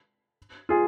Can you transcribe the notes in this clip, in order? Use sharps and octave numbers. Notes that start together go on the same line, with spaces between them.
F4 G#4